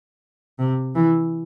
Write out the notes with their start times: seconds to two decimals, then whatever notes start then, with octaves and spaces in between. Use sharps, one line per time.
0.59 C3
0.95 E3